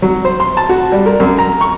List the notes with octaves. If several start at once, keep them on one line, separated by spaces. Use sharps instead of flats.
F#3
C5
C6
A5
F#4
G3
A#4
F#2
A#5
C#6